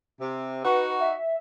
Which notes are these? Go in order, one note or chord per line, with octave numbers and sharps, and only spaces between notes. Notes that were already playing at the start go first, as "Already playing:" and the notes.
C3
D#4 F#4 B4
E5